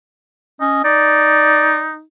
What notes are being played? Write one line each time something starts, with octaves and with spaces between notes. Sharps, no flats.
C#4 D#5
D#4 D5